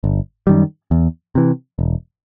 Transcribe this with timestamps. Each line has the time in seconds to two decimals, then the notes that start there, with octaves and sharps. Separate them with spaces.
0.04 G1
0.47 F#2 D#3 G3
0.91 E2
1.35 C3 E3
1.79 E1